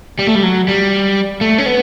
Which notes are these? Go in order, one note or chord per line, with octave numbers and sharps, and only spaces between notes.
G3
A3
G3
F#3
G3
A3
C#4
B3